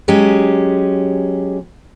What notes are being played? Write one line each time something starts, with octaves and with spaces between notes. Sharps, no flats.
F#3 G#3 C#4 G4